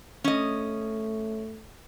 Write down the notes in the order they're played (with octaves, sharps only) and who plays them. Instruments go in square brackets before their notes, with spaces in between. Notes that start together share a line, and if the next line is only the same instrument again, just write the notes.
[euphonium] A3 [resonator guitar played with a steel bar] C#4 D#5